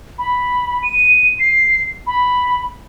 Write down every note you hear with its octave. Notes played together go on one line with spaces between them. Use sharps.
B5
D#7
C7
B5